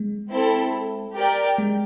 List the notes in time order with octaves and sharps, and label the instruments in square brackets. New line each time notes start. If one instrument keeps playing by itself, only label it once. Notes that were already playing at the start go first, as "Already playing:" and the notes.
Already playing: [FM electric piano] G#3
[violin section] C4 E4 A4
G4 A#4 D5 G5
[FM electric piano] G#3